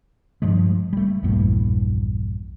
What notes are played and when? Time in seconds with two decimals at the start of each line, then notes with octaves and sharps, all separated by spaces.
0.42 G2 F3 G3 G#3
0.93 G3 A3
1.23 A#1 E2 G2